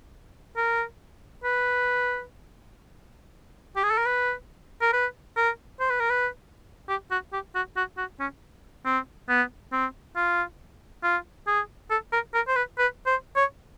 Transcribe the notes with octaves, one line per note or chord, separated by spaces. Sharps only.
A#4
B4
G4
G#4
A4
A#4
B4
A#4
B4
A#4
C5
B4
A#4
B4
G4
F#4
G4
F#4
F#4
F#4
C#4
C4
B3
C4
F4
F4
G#4
A4
A#4
A#4
C5
B4
B4
C5
C#5